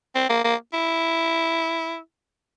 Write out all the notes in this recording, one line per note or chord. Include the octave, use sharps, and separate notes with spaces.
C4
A#3
A#3
E4